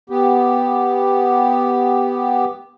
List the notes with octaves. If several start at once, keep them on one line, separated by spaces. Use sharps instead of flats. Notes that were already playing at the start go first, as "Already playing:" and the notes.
B3 G4